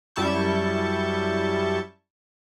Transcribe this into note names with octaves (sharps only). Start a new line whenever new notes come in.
F#2 G3 E4 A5 C#6 G6